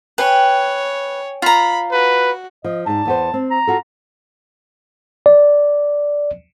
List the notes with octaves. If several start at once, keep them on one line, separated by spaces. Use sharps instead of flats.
B4 C#5 G5 G#5
F4 A#5 B5
F#4 B4
F3 D#5
G#2 D5 A5
E2 B3 C5
C4
A#5
F4 F#4 A4
D5